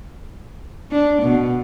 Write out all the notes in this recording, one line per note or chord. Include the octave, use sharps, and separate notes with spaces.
D4
B2